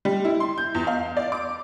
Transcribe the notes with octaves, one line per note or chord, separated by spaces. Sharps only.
G3
E4
C6
G6
E2
F5
D5
D6